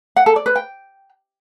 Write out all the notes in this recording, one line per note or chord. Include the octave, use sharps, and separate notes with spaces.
F#5
A4
D5
B4
G5